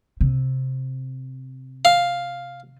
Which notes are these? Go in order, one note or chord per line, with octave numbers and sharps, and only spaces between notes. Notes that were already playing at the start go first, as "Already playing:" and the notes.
C3
F5